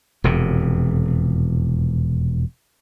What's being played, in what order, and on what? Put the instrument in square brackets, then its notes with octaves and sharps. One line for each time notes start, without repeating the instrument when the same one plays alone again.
[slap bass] E1 F2 C3